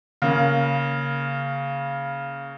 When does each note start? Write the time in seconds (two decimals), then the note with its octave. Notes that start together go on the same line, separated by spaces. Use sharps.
0.22 C#3 A#3